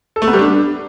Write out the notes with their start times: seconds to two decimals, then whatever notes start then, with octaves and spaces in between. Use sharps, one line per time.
0.16 A4
0.22 A3
0.27 B3
0.33 G3
0.39 D4